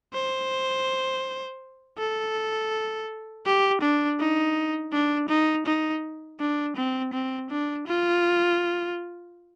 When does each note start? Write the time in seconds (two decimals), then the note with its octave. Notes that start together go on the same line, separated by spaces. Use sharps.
0.14 C5
1.98 A4
3.46 G4
3.82 D4
4.19 D#4
4.92 D4
5.29 D#4
5.67 D#4
6.40 D4
6.76 C4
7.13 C4
7.50 D4
7.87 F4